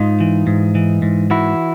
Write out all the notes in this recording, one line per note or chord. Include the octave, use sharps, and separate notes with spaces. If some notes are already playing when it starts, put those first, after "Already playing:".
Already playing: G#2 D#4 F4
E3
G#2
E3
G#2
E3 E4 F#4